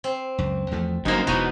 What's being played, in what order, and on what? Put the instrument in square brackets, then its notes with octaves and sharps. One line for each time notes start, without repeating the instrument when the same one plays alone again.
[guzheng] C4
[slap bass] C#2 F#2
E2 F3 A3
[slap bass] G1 D3 [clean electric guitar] F#2 A#3 [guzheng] D#4 C5
[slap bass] E1 E3 [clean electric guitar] B2 D#4 [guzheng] B3 F#4